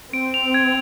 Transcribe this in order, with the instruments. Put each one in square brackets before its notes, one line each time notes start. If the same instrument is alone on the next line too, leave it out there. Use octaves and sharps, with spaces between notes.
[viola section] C4 [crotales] D7
[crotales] F7
G#6